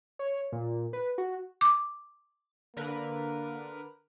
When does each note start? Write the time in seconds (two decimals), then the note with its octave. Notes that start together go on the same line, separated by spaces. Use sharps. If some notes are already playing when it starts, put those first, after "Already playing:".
0.19 C#5
0.52 A#2
0.93 B4
1.18 F#4
1.61 D6
2.77 D3 A#3 A#4 B4